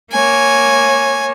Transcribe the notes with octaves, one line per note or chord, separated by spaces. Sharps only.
A#3 C#5 G#5